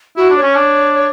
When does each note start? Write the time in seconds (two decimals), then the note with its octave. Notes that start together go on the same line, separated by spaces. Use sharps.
0.16 E4 F#4
0.30 D4
0.37 C#5
0.43 C#4
0.55 D4